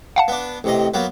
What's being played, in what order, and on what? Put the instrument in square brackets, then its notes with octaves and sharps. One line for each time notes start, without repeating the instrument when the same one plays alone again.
[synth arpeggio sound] F5 F#5 A5
[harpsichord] B3 D4
A1 C3 D#5
F#3 A#3 B3